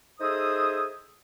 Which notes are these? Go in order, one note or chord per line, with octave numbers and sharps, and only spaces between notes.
D#4 G#4 A4 C5 E5 D#6